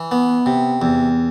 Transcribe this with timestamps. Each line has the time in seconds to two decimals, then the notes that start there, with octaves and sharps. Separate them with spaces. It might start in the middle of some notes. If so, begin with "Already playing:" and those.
Already playing: E3
0.11 B3
0.46 C3
0.82 E2